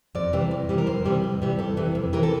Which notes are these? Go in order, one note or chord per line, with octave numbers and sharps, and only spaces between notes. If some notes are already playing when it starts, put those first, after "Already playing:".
F2 D5
C3 E3 G3
F2
C3 E3 G3
A#4
F2 C5
C3 E3 G3
F2
C3 E3 G3
F2 A4
C3 E3
F2
C3 E3 A#4
A4